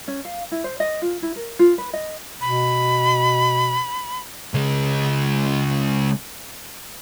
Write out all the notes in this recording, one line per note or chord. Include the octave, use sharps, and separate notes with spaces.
C#4
F5
E4
C5
D#5
F4
E4
A#4
F4
B4
D#5
B2 B5
C#3 G#3